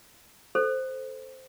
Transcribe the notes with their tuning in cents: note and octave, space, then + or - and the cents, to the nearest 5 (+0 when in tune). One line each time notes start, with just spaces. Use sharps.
A4 +0 C5 +0